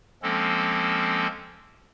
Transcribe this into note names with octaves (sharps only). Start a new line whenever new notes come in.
F3 G#3 A#3 C4 C#4 A4